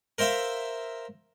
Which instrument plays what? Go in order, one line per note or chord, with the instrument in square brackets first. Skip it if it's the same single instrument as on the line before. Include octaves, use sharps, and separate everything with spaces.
[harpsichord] A#4 C5 E5 F5